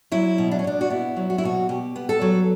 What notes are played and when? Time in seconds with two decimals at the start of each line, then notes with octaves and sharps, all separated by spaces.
0.12 F#3 E4
0.38 B2
0.51 D4
0.59 C#4
0.64 B2 D4
0.81 F#4
0.90 B3 E4
1.17 F#3
1.30 F#4
1.38 E4
1.43 B2 F#4
1.69 B2 G4
1.96 B3
2.09 A4
2.21 F#3